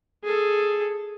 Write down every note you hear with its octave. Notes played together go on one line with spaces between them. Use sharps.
G#4 A4